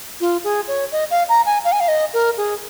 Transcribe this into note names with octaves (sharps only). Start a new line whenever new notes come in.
F4
G#4
C#5
D#5
F5
A#5
G#5
F5
G#5
F5
D#5
A#4
G#4